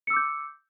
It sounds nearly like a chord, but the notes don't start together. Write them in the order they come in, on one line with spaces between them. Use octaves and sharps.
C#7 E6 D6 G6